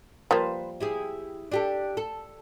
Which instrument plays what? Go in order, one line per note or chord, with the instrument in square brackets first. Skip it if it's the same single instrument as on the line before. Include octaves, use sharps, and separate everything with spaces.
[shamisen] F3 G3 A#3 [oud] B4 C5
[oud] E4 G4 G#4
D4 G4 A4
A4